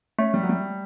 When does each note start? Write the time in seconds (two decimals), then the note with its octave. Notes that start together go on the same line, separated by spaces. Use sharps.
0.19 A3 C#4
0.34 G3
0.43 F#3
0.49 G3